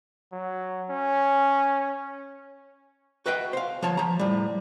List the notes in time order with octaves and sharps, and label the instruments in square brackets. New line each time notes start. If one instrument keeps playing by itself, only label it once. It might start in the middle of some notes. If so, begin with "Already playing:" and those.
[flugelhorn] F#3
C#4
[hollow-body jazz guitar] F#4 B4 D#5 E5 F#5 G5
C5 F5
F3 C#5 A5
F3 A#5
A2 G3